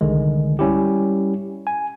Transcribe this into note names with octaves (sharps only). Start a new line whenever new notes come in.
C2 D3 D#3 G#3
G3 C#4 E4 G4
G#5